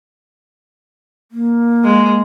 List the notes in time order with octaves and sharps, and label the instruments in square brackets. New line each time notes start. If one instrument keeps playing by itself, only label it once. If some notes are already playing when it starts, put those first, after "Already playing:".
[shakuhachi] A#3
[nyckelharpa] G#3